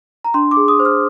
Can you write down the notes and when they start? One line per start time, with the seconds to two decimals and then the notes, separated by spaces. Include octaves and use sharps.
0.25 A#5
0.34 D4 C6
0.51 D6
0.57 G#4
0.68 D#6
0.80 C5
0.85 F6